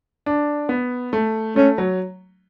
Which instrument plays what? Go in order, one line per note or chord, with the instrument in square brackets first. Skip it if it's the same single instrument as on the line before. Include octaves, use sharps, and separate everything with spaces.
[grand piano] D4
B3
A3
[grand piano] A3 [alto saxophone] C#4
[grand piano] F#3